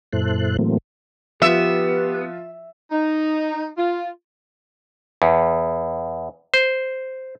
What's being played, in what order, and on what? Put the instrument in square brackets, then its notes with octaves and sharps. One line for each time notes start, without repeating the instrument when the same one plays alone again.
[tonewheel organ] F#2 A#2 E4 A4 C5 F#6
A2 E3 F#3 A3 A#3 C4
[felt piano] F3 F4 [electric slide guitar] B3 [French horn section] G4 B4 [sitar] E5
[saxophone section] D#4
F4
[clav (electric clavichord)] E2
C5